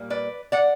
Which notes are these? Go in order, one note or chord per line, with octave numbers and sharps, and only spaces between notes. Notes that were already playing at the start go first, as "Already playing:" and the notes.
Already playing: A#2 G3 A#3
B4 D5
D5 F#5